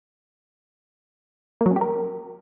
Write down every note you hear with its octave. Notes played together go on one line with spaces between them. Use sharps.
A#3
F#3
C#4
G4
A#4